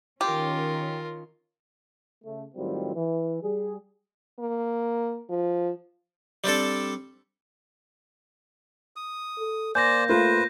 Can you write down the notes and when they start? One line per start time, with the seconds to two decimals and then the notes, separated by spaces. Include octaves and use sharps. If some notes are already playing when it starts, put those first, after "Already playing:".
0.21 D#3 C#4 F4 G4 A#4
2.24 C#3 A3
2.55 A2 D#3 F#3 G3 C4 F4
2.95 E3
3.42 G3 G#4
4.39 A#3
5.30 F3
6.44 G3 C4 D4 A4
8.96 D#6
9.38 A4
9.75 A#3 C5 D5 G#5 G6 A#6
10.09 A3 F4 B4 C5